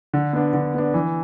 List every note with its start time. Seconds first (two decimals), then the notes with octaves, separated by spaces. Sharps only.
0.13 D3
0.33 B3 D4
0.53 D3
0.74 B3 D4
0.94 E3